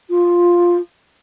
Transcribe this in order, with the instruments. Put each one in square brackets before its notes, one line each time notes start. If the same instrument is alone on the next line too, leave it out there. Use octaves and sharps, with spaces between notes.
[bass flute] F4